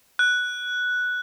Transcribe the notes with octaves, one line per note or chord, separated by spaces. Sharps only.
F#6